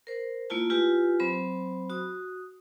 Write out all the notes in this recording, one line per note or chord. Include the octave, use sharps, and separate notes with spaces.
A#4 C5
A3 A#3 E4 F4 A5
E4 F4 G4 B4 G#5
F#3 C4 C5 B5
F#4 D#6